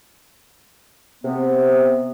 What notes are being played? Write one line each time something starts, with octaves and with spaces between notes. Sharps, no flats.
C3 B3